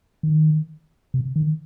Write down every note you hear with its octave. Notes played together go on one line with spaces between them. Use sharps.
D#3
C3
D#3